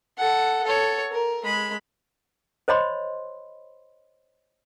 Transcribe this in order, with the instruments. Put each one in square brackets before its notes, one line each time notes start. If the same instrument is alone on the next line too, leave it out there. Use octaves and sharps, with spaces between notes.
[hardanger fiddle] A4 F#5
A4 C#5
A#4
G#3 B5
[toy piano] C5 C#5 D#5 B5 C6